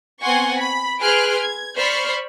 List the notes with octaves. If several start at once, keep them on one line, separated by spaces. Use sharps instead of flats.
B3 C4 F#5 G#5 C6 C#6
B5
G#4 B4 C6 F6 F#6 D7
G#6
C5 D5 B5 C#6 F6 C7